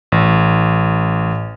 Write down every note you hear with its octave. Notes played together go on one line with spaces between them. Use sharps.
A1